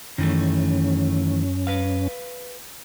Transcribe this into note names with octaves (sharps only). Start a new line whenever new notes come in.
F#2 D#3 E3 A3 C#4
B4 F5